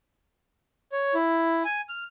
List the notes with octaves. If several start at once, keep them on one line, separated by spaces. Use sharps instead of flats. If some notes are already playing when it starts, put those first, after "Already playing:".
C#5
E4
G#5
F6